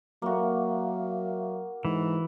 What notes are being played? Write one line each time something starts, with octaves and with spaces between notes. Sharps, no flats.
F#3 A#3 F#4 E5 F5
G#2 E3